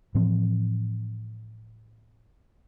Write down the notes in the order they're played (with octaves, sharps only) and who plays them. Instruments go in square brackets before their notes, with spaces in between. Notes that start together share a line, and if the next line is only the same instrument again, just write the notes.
[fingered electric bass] A2 E3 F3 C4